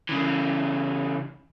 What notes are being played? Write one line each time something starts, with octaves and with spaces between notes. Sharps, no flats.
C#3 E3